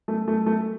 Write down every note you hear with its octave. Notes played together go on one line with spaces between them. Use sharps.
A3
A3
A3